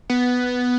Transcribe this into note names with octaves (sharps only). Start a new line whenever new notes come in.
B3